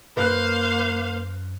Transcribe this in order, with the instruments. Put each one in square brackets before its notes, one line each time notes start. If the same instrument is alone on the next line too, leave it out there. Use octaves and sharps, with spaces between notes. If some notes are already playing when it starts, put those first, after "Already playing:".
[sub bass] F#2 [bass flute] A#3 [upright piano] B4 F#6 [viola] C5 F5